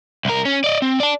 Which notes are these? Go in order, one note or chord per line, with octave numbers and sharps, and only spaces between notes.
C2 A#4
C#4
D5 D#5
C4
D5 A5